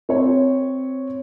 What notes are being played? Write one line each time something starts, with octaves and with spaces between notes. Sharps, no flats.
C4 C#5